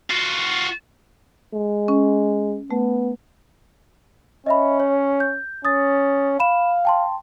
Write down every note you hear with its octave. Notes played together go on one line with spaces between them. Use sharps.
F4 F#4
G#3
C#4
A3 B3
C#4 D#5 E5 B5
C#5
G6
C#4 D#6 A6
F5 B5 E7
G5 A5 C6